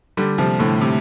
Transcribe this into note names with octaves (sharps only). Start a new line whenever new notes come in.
D3 G3
C3 F3
A2 D3
C3